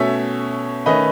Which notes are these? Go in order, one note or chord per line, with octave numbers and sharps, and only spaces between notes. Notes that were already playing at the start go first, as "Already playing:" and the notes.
Already playing: B2 A3 C#4 C#5 E5
D#3 A3 C#4 B4 D#5